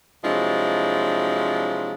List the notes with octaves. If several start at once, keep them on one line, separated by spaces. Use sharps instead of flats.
C3 F3 F#3 G#3 D4 E4